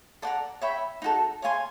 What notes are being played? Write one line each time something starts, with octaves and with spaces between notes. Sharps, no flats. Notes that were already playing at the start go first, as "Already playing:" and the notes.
A4 D5 F#5 A#5
C#5 E5 G5 B5
D#4 F#4 A4
C#5 F5 G#5 C6